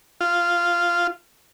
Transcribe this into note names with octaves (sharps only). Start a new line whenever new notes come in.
F4